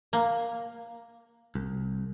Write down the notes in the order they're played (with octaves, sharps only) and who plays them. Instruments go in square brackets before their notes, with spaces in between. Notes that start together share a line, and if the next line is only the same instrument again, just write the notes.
[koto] A#3
[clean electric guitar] C2